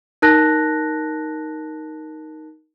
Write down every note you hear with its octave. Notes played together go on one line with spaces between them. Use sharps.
D#4 A#4 A5 F#6 A#6